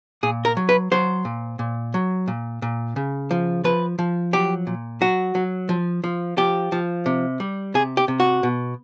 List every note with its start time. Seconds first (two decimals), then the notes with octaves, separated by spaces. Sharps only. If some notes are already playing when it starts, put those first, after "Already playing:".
0.23 A#2 G#4
0.45 A#4
0.57 F#3
0.69 B4
0.91 F#3 C5
1.25 A#2
1.59 A#2
1.94 F#3
2.28 A#2
2.62 A#2
2.96 C#3
3.31 F3
3.64 F3 B4
3.99 F3
4.33 F#3 G4
4.67 A#2
5.01 F#3 F#4
5.35 F#3
5.69 F3
6.04 F3
6.37 F3 G4
6.72 F3
7.06 C3
7.40 G3
7.74 C3 G#4
7.97 G4
8.08 C3
8.20 F#4
8.43 B2